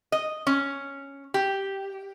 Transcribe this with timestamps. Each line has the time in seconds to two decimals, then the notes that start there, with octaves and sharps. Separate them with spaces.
0.12 D#5
0.47 C#4
1.34 G4